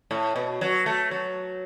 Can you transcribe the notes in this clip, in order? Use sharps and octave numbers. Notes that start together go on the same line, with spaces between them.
A2
B2
F#3
A3
F#3